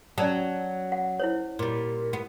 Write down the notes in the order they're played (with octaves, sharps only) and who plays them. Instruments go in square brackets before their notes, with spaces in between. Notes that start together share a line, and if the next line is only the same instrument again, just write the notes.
[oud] F#3 [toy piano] C#4 D5 A5
[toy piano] F#5
E4 C5 C#5
[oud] A#2 G3
B3